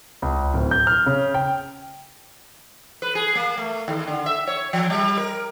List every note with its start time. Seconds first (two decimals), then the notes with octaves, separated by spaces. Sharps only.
0.22 C#2
0.54 D1
0.71 G6
0.87 F6
1.06 C#3
1.34 G5
3.02 B4
3.15 G#4
3.35 A#3
3.57 A3
3.88 D#2
4.07 D3
4.26 E5
4.47 C#5
4.73 F3
4.90 G3
5.17 A#4